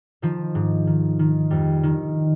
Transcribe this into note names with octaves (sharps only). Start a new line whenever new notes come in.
D#3 F3
G#2
D#3
D#3
F2 G3
D#3